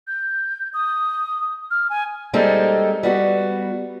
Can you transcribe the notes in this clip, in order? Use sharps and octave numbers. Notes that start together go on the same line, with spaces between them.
G6
D#6
F6
G#5
G3 G#3 A#3 C4 D#4 A4
G3 B3 F#4